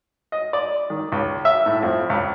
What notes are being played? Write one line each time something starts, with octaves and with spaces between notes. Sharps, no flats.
D#5
D5
D#3
C#2
E5
A2
F2
C#2